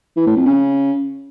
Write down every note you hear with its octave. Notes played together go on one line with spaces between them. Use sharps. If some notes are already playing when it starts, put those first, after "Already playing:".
E3
A2
F2
C#3